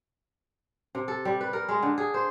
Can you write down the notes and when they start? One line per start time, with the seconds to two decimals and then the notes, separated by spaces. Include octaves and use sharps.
0.95 C3
1.08 A4
1.25 G3
1.41 B4
1.53 A#4
1.69 G#3
1.83 D3
1.98 G#4
2.14 C5